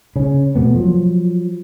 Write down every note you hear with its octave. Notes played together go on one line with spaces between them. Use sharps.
C#3 C#4
B2 A3 B3
F3 F#3